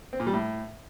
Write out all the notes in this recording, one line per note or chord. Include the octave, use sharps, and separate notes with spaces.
C4
A#2
G3
A2